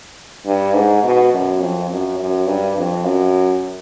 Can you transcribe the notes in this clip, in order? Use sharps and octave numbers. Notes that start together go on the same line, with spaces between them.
G2
G#2
B2
F#2
F2
F#2
F#2
G2
F2
F#2